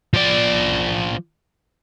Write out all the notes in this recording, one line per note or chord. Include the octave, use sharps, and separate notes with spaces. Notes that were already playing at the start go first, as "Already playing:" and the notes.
F3 D5